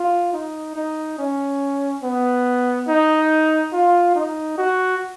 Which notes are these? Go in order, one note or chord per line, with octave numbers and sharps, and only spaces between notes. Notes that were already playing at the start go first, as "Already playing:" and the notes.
Already playing: F4
D#4
D#4
C#4
B3
D#4
F4
D#4
F#4